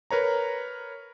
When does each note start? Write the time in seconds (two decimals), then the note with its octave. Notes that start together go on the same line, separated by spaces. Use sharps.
0.11 A#4 B4 C#5 A#5